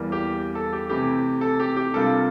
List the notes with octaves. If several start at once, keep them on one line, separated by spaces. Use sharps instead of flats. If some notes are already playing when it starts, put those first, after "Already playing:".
Already playing: E2 E3 G3 A#3
G4
A4
G4
C3 E3 A3 E4 G4
A4
G4
G4
C3 G3 A#3 D4 F4 A4